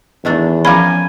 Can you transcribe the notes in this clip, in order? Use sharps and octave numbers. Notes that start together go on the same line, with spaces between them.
E2 D#3 A3 D4
F3 C#4 A#4 F5 G#5 B5